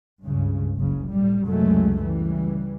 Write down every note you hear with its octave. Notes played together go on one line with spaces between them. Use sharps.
C#2 G2 C#3
F#1 C#3
A2 G3
C#2 F#2 C3 F#3 G#3 A3
C#3 E3 G3